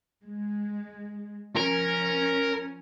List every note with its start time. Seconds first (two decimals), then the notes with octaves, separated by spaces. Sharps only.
0.25 G#3
1.57 F3 C#4 A#4